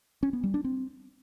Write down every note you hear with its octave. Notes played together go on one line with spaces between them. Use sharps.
C#4
B3
G3
D4
C4